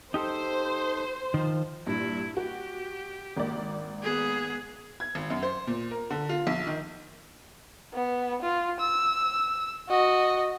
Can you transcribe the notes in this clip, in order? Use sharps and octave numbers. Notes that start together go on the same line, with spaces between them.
D#4 G4 A4 C5
D#3 F3
G2 A#2 E4
F#4 G4
G#1 A#3 D5
B3 G#4
G#6
G#1
F#2
C5
A#2
A#4
D3
F4
A#1
D#3
B3
F4
E6
F#4 D#5